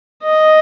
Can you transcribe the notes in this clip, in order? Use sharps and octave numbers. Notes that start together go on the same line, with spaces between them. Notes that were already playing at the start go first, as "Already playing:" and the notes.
D#5